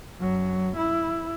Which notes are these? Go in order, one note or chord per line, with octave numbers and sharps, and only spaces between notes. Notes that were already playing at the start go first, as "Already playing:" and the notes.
F#2 F#3
E4